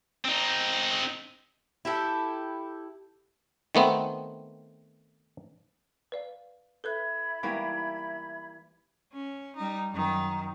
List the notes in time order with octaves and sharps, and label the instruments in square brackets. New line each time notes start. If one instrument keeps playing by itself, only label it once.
[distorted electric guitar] C4 D#4
[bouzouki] E4 G4 A4
[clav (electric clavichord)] D#3 A3 B3 C4
[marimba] B4 D5 F5
[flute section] E4 B5 G#6 [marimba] A4 B4 F#6
[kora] E3 G3 A#3 [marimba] G#3 B3 D#4
[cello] C#4
G3 D#4
F#2 D#3